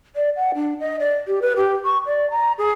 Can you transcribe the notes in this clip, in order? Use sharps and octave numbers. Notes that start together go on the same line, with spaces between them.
D5
F#5
D4
D#5
D5
G4
B4
G4
C#6
D5
A#5
G#4